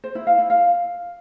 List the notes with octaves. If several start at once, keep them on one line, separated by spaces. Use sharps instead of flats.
C5
E4
F5
E4
F5